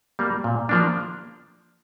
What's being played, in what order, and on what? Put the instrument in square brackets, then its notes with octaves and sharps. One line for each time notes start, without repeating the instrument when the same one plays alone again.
[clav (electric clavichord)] G3 A#3
A#2
F3 A#3 D4